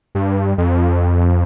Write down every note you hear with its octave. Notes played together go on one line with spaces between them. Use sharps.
G2
F2